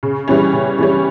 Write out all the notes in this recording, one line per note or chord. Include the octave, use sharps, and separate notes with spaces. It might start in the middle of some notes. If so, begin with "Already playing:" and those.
C#3
E3 G3 C#4
C#3
E3 G3 C#4